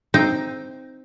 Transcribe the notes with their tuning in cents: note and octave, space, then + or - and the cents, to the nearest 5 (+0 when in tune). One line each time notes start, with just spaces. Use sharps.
C4 +0 D#4 +0 G5 +0